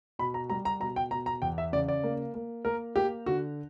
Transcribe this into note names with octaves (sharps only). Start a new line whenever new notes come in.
B2 B5
A#5
G3 A#5
A#5
B2 A#5
G5
B2 A#5
A#5
E2 G5
E5
C#3 D5
D5
A#3
A#3
A#3 A#4
A#3 G4
D3 F#4